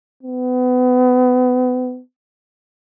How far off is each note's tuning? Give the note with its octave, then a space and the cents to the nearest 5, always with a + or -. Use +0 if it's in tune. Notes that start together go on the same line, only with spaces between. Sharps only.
B3 +30